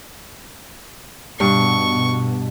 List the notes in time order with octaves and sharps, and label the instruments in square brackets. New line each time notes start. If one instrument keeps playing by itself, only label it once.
[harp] G2 [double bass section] B2 [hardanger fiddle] C#6